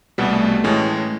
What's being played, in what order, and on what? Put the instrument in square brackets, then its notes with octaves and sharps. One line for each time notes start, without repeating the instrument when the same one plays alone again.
[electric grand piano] C2 B2 G3 B3 [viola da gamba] A3
[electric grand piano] A2 E3 G#3 C#4